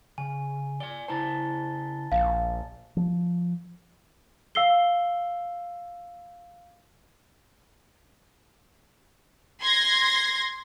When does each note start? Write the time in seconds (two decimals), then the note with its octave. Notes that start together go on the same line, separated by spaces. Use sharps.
0.18 C#3 G#5
0.80 D5 G#5 G7
1.08 C#3 E4 C5 A5 A#5 A6
2.12 A#1 F5
2.97 F3
4.55 F5 E6 C7 G7
9.61 C6 G#6 A#6